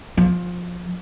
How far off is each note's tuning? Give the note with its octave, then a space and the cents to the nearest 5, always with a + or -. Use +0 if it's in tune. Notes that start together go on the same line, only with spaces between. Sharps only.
F3 +20